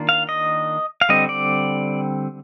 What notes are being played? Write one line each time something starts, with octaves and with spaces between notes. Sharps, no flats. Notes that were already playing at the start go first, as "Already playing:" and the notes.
Already playing: D#3 A#3 D4 F4
F5
D#5
F5
D3 G3 C4 D#5
D5